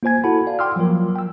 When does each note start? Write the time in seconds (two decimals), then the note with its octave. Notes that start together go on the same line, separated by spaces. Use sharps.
0.03 A#3 F4 C5 G#5 G#6
0.24 E4 F#4 A4 F#5 A5 B5
0.47 D5 F5
0.59 G5 C6 D6 E6 F6
0.76 F3 F#3 A#3 F4 A#4
1.15 G5 E6